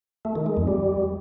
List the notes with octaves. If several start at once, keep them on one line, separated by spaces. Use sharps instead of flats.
A3
D#3
G#3
F2
G3